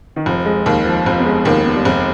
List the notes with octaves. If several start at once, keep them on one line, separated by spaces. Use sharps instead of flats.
D#3
F1 F3
G#3
D#2 D#3
F3
F1 F3
B3
G#3
D#2 D#3 B3
B3
G3
F1 G#3